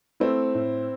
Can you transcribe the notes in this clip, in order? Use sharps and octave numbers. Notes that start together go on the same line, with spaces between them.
A3 C4 E4
A2